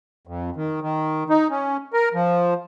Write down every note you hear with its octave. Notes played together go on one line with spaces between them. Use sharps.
F2
D#3
D#3
D#4
C#4
A#4
F3